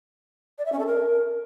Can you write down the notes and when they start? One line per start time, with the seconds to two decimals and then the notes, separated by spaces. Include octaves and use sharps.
0.58 D5
0.65 E5
0.72 C#4
0.79 A4
0.86 A#4